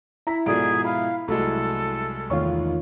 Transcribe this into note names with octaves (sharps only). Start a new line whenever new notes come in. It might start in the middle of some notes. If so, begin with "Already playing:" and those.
E4 A#5 B6
G#2 B2 F3 G#4 A4 D5 D7
F5 B5
C2 F#3 G#3 A3 A4
E2 D#3 A3 F4 C#5 C#6